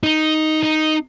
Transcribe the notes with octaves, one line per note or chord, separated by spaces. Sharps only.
D#4
D#4